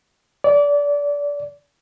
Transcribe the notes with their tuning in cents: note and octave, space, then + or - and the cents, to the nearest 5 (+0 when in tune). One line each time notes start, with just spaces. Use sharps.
D5 -25